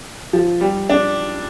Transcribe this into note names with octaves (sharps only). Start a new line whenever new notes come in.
F3
G3
D4